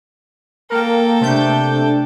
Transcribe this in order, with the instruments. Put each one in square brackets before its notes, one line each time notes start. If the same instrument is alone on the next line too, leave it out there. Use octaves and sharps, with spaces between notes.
[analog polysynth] A#3 A#4 [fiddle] A4 G5
[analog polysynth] C3 A3 G6 [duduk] D4